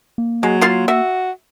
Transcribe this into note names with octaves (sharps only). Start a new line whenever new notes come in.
A#3
F#3 G#3
F4 F5 C6
F#4 E5